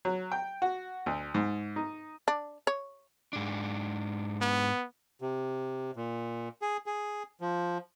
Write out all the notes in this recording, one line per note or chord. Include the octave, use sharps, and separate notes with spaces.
F#3
G5
F#4
D2
G#2
D#4
D4
C#5
G#2 D4
B3
C3
A#2
G#4
G#4
F3